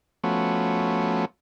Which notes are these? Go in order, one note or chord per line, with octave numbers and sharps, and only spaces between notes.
F3 A3 B3 C#4 F#4